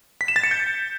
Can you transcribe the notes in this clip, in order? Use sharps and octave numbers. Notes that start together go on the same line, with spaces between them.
B6
E7
A6
C#7
G6